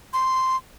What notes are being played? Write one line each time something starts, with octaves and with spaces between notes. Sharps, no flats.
C6